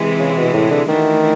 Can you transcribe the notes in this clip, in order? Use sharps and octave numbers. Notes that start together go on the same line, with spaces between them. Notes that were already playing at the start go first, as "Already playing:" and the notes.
Already playing: C3 E3 G#3
C#3
B2
A2
D3
D#3 E3 A3 D4 F#4